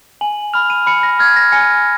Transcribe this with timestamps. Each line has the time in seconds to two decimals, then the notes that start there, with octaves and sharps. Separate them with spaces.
0.21 G#5 F#7
0.53 B5 F6 F7
0.70 D#7
0.86 B5 C#7
1.03 A#6
1.19 F6 G#6
1.36 A#6
1.52 G#5 C#7